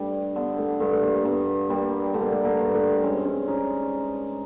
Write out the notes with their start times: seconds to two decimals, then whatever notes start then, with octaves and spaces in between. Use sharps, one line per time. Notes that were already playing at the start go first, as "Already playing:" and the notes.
Already playing: G2 G3 A3
0.36 D3 B3
0.59 A3
0.80 G2 A3
0.92 A3
1.03 A#3
1.25 G2 B3
1.69 G3 A#3
2.14 D3 A3
2.21 A#3
2.30 A3
2.45 A#3
2.59 G2
2.74 A3
3.03 G#3 C#4
3.14 C4
3.26 C#4
3.48 C#4 D#4